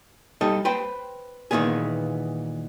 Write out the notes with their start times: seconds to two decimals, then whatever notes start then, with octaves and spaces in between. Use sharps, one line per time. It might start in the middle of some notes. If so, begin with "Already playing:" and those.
0.41 G3 D#4 A4 D#5
0.65 B4 C5 G5
1.51 A#2 D#3 E3 B3 G#4